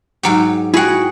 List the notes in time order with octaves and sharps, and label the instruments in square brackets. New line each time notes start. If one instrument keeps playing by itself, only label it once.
[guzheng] G#2 F#3 G4
[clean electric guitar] E4 F#4 G5 [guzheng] G#4 F#5